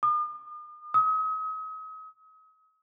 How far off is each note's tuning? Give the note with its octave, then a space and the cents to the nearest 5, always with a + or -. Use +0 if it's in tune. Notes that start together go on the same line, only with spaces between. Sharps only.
D#6 -45
D#6 +40